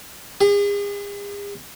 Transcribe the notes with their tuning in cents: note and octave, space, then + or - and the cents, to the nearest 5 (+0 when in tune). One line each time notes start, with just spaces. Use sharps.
G#4 -40